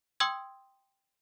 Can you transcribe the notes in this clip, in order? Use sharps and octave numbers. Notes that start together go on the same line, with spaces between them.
G5 C6 D#6 E6 G#6